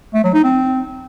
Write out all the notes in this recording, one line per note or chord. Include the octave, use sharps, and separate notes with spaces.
A3
F#3
D#4
C4